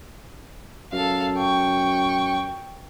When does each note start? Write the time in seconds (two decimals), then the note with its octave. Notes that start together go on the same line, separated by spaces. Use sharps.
0.93 F#2 A4 F5
1.38 G5 C#6